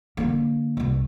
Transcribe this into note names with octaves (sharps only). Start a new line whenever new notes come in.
D3 A#3
C2 G2